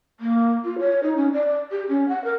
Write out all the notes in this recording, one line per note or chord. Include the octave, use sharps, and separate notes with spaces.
A#3
F4
C#5
D#4
C#4
D5
G4
C#4
F#5
A#4